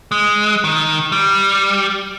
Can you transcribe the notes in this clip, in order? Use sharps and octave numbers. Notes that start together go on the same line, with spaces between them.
G#3
D#3
G3